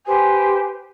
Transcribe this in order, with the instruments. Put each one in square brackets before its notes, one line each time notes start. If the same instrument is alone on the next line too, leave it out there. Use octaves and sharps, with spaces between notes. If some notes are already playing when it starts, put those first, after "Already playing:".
[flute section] G4 B4 C5 [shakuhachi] G#5